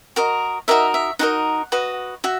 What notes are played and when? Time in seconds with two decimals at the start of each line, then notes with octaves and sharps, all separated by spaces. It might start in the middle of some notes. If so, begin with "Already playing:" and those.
0.16 F#4 A#4 D#5
0.68 D#4 F#4 A#4 D#5 E5
0.94 E5
1.19 D#4 F#4 A#4 D#5 F#5
1.72 F#4 B4 D#5
2.24 F#4 E5